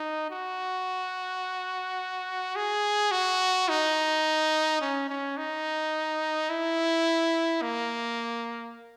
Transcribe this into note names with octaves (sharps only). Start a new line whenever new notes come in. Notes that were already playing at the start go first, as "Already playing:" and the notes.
Already playing: D#4
F#4
G#4
F#4
D#4
C#4
C#4
D#4
E4
A#3